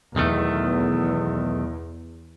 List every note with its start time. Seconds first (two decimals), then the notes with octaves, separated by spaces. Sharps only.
0.16 B1 E2 D#3 A3